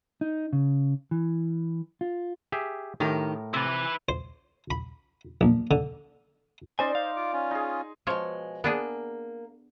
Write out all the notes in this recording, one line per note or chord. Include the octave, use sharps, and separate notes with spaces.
D#4
C#3
E3
F4
G4 G#4 E5
A2 D#3 G4 A#4
C3 E4 B4
C5
B5
A#1
D3
C#4 D#4 C5 D5 G#5 C6
C5 F5
F4 D6
C#4 F4
D#4 G#4
B2 F3 G#3 C#5
A#3 B3 D4 G#4